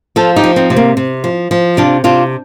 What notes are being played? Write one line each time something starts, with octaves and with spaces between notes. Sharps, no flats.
F3 F4 A4
D#4 G4
F3
C4 D#4
C3
A#3
C3
F3
F3
C3 D4 F4
C3 D4 F4